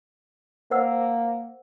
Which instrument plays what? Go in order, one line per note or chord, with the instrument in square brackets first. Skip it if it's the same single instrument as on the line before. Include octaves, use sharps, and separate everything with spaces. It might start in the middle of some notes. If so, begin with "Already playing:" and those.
[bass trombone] A#3 [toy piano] C5 F#5 E6